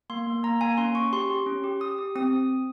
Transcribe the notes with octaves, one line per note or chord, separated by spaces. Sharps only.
A#3 C6
A#3
A#3 A#5
A#3 G#5
C#4 C6
C#4 C#6
G4 C6
G4
C#4
G4
G4 D#6
G4
C4 D#6